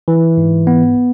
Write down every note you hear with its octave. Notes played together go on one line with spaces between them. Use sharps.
E3
G#2
B3